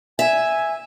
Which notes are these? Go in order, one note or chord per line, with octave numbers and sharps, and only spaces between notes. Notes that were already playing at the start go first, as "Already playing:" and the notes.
E5 G#5